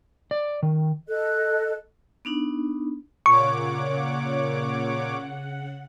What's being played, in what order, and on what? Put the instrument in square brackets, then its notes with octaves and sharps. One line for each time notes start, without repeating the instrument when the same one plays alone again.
[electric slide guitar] D5
D#3
[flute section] A4 D#5 F#6
[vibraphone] B3 D4 D#4
[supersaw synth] A#2 C#5 D6 [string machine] C#3 F#5 [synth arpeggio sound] C#6